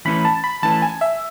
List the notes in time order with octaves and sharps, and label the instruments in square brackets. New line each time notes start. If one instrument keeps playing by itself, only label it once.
[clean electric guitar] E3 A3 C#4 E4 B4 [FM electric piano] B5
[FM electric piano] A5
B5
[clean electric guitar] E3 A3 C#4 E4 B4 [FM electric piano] A5
[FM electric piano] G#5
E5